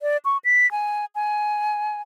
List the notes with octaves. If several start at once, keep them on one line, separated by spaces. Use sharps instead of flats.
D5
C#6
B6
G#5
G#5